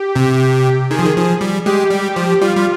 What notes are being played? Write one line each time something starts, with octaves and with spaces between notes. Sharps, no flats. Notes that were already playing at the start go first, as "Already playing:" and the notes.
Already playing: G4
C3
D#3 G#4
F3
D#3
F3
G3
G#3 G4
G3
G4
F3
G3 F4
G3